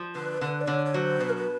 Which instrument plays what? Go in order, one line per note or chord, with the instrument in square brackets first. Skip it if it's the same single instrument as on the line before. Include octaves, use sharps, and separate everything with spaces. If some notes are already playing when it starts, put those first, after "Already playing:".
Already playing: [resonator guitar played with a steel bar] F3
[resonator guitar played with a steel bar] D3 [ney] B4
[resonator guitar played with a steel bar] D3 [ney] B4
[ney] D5
[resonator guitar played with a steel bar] D3 [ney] C#5
[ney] C#5
[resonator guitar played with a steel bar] F#3 [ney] C5
[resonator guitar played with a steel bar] B2 [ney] B4
[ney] A#4
B4